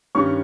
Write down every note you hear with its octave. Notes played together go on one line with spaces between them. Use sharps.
G2 D#3 G3 C#4 C#6